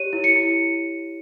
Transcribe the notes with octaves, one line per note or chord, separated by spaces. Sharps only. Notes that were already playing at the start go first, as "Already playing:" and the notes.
Already playing: G4 C#5 D#7
E4
C#7
E4